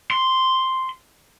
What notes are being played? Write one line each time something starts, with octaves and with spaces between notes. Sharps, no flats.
C6